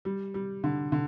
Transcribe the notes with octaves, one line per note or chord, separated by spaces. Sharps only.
G3
G3
D3
D3